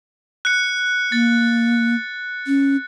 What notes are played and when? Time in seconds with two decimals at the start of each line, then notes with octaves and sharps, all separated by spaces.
0.45 F#6 C#7
1.12 A#3 A6
2.47 C#4